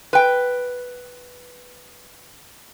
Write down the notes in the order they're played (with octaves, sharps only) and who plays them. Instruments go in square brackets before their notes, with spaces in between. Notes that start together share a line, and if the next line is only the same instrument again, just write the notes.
[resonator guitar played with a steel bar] B4 G5